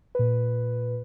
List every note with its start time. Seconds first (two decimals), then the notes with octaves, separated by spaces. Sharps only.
0.15 A#2 B4